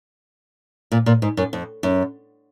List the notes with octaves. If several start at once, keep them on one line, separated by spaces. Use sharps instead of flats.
A#2
A#2
G#2
F#2
F2
F#2